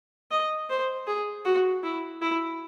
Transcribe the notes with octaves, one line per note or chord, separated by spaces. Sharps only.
D#5
C5
G#4
F#4
E4
E4